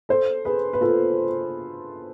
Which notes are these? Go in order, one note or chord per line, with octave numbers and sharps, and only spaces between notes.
A4 C5
G#4 B4
B4
F4 A4